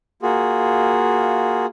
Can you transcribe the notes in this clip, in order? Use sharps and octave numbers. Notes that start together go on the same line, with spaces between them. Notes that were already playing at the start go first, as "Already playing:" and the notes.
A#3 F4 F#4 G#4